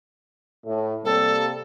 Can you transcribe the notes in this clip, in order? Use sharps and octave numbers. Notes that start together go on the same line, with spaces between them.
A2 A3
C3 G3 A#3 A4